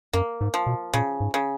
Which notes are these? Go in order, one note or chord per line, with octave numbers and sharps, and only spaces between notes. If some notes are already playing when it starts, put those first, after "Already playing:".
F#2 A#3
G#2
F3
B2
A#2 C#3
G#2
C#3